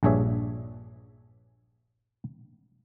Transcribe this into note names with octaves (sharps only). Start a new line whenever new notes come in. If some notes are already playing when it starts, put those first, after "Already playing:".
A#1 G2 D4 G#4 C#5 E5